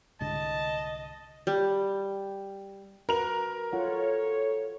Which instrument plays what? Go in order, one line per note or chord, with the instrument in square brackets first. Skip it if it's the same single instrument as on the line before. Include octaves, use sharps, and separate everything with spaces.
[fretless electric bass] C2 G#2 D3 [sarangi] D#5 [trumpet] A5
[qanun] G3
[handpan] F#4 B4 [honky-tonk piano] A#4 F7
[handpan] F4 F#5 [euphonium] A4 [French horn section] C#5